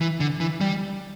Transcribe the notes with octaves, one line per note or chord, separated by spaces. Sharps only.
E3
D3
E3
G3